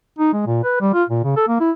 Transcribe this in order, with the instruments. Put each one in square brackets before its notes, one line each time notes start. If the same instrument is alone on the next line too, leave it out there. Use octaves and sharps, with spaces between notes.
[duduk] D#4
G#3
A#2
B4
G3
F4
A#2
C#3
A4
A#3
E4